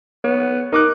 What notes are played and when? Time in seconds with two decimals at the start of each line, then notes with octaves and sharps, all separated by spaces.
0.24 B3 C#5
0.73 D#4 A#4 D6 F#6